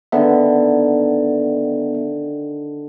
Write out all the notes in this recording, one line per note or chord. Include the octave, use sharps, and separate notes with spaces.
D3 D#3 B3 E5